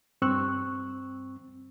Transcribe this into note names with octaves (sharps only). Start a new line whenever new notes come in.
G2 C4 C#6 E6 F#6